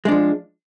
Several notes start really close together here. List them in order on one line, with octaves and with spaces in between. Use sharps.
G#3 D4 F3